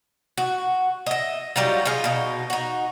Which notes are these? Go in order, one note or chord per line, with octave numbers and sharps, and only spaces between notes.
F#4
D#5 E5
F#3 G3 D#4 F4
F4 G#4 D#5
B2 D#4
D#4 F#4